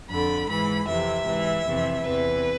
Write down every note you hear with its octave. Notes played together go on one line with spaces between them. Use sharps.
F2 D3 B5
G#2 E3 B5
F2 C3 E3 E5
G#2 E3
F2 C3 E3
E2 C3 E3 B4